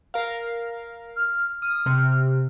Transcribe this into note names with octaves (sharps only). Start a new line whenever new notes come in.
A#4 F5
F6
D#6 F6
C3